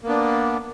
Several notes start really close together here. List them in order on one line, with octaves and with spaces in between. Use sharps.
A#3 B3 D4